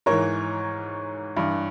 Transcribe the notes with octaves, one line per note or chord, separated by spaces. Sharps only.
G#2 E3 A#4 C#5
G2 E3